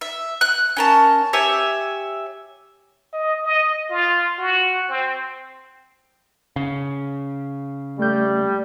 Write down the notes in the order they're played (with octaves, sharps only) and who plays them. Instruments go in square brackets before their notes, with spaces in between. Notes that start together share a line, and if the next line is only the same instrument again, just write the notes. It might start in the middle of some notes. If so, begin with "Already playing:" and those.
[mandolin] E5
F#6
C#4 A#4 A5
G4 C#5 E5 G#5
[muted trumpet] D#5
D#5
F4
F#4
C4
[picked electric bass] C#3
[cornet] G3 [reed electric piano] A3 G6